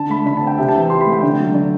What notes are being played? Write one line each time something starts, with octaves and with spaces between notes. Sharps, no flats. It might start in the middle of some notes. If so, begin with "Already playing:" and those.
Already playing: D3 A5
A3 B5
D3 B5
A5
C4
G5
C3 E5
A5
E3
C3 C6
B5
A3
G5
D3
F#3
D3